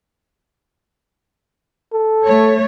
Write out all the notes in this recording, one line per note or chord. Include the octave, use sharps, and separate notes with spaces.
A4
A3 C#5